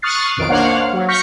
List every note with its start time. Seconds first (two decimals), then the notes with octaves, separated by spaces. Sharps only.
0.02 C#6 D#6 F6 F#6 A6 C7
0.37 B1 F2 D#3 D7
0.49 A#3 D4 C5 C#5 F5 F#5
0.93 F#3
1.08 C#6 F6 G6 A#6 B6 C#7